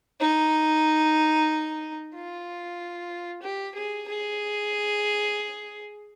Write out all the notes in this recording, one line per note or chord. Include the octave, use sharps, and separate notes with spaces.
D#4
F4
G4
G#4
G#4